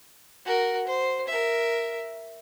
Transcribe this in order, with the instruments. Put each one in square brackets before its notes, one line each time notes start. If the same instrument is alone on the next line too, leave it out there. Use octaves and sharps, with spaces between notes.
[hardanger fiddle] F#4 A#4
C5
A#4 E5